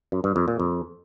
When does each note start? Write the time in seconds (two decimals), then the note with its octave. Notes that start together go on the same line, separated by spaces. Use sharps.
0.12 F#2
0.24 G2
0.36 F2
0.48 A#2
0.60 F2